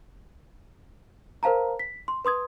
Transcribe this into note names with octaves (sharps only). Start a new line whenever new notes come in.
A#4 C5 F5 A5 A#5
B6
C6
B4 C6 D#6 G#6